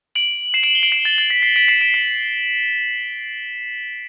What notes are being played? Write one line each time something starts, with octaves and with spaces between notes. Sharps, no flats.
D7 F#7
C7 E7
D7 F#7
G7
D7 F#7
C7 E7
A6
A6
B6
C7
B6 D7
C7 E7
B6 D7
C7